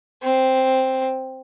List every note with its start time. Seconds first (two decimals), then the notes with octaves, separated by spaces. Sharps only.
0.23 C4